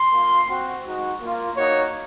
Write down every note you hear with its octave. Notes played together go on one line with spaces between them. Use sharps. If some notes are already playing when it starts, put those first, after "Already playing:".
Already playing: C6
A#3 F4
C4 F#4
G#3 D#4 F#4
A#3 F4
A#3 D#4 F#4 C#5